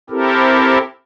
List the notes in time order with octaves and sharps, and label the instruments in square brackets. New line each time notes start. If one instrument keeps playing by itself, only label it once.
[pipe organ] C4 E4 G4 A4 A#4